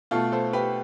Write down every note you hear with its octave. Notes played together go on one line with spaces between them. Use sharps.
B2 A3 F4 A4
A4 C5
G4 B4